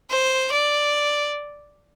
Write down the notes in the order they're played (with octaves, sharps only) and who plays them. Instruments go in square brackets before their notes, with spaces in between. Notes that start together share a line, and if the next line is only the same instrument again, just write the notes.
[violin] C5
D5